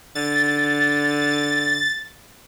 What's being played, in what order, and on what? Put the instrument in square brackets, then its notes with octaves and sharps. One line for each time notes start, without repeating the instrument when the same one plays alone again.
[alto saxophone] D3 [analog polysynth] A6